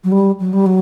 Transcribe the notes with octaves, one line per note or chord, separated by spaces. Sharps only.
F#3
G3
F#3
G3
F#3